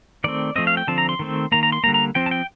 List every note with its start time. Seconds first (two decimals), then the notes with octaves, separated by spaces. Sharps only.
0.24 D#3 A3 C4 D5
0.56 F3 A3 C4 D#5
0.67 F5
0.77 G5
0.87 D3 F3 C4 A5
0.98 A#5
1.09 C6
1.19 D#3 A3 C4
1.52 D#3 A#3 A#5
1.63 A#5
1.72 C6
1.83 A#3 A#5
1.86 D3 G3
1.94 A#5
2.15 F3 C4 G5
2.26 A5
2.31 G5